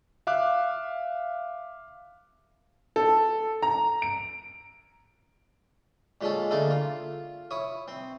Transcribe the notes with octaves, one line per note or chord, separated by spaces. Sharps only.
E5 F5 D6 F#6
A4
A#5
D7
A#2 G#3 C#4 A4
D3 A3 A#3 E4 G#4 A4
F4
E4 C#5 D#6
C4